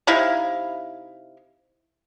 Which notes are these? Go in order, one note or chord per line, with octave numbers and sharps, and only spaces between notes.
C3 D#4 E4 F5